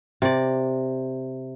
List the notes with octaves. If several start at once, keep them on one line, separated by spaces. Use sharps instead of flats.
C3 D5